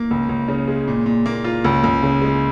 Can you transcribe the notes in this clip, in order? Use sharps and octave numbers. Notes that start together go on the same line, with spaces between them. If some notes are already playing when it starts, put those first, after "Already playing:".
Already playing: A#3
C#2
C#2
C#3
G#3
A#2
A#2
A#3
F4
C#2
C#2
C#3
G#3